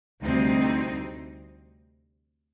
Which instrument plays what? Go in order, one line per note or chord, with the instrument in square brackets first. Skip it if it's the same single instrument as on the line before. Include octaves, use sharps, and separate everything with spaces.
[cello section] D2 C3 G3 C4 D#4